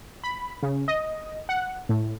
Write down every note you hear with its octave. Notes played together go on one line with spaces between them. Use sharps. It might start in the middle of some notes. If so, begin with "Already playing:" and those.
B5
C#3
D#5
F#5
A2